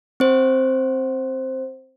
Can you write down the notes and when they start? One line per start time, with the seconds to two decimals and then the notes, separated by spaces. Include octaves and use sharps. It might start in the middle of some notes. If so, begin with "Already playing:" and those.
0.20 C4 C5